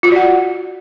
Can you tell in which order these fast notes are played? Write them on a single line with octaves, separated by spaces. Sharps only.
F4 F#4 D5 F#5